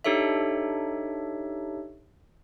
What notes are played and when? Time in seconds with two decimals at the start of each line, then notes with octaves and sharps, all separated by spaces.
0.04 D4 D#4 G4 A4 C#5 E5